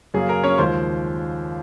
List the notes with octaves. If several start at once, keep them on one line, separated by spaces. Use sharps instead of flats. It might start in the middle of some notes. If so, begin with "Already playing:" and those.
F#2 C#3 F#3 A#3 G#4
A#4
C#4 C#5
D#2 C#3 F3 G#3 C5 C6